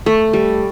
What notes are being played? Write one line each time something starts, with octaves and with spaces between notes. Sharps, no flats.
A3
G3